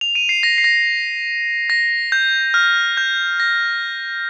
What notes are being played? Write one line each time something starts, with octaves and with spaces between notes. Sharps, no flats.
F7
D#7
C7
A#6
C7
A#6
A#6
G6
F6
G6
A#6